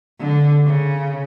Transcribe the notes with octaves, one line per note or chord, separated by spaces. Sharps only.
D3
C#3